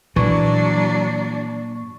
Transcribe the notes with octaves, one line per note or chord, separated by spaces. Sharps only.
A#2 E3 F#3 D4 C#6